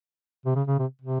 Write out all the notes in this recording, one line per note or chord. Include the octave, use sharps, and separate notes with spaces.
C3
C#3
C#3
C3
C3